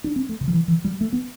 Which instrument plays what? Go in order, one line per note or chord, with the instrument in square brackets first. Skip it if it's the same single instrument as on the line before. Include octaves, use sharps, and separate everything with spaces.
[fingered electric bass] D4
C4
A3
C3
F3
E3
E3
G3
A3
B3